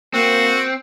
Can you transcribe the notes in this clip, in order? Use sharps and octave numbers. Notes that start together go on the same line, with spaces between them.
A#3 C4 F#4